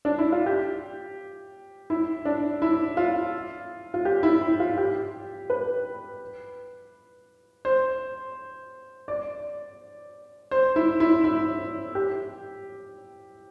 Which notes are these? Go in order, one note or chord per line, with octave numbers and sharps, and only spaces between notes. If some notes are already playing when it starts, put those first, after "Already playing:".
D4
E4
F4
G4
E4
D4
E4
F4
F4
G4
E4
E4
F4
G4
B4
C5
D5
C5
E4
E4
E4
G4